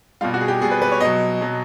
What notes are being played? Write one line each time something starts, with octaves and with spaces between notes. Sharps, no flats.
B2 G3 F4
F#4
G#4
G4
B2 G3 G#4
B4
B4
C#5
B2 F#3 D#5
B2 F#3